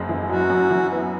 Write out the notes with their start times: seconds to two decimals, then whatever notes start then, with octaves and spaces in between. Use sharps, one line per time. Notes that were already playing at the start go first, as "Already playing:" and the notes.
Already playing: F#1 F#2 G#3
0.09 E3
0.30 F#2 F#4
0.50 F#2
0.70 E3
0.91 B3